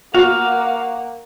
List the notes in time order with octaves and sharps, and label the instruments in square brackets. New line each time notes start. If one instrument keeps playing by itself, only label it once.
[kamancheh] A#3 F#5 [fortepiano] F#4 [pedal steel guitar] F5